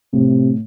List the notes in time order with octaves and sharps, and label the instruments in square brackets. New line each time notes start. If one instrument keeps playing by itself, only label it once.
[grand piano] A2 [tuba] C3